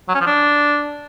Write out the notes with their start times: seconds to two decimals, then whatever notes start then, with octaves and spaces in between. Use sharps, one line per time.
0.09 F#3
0.15 C#4
0.21 F3
0.27 D4